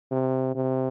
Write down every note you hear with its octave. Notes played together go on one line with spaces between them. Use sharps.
C3
C3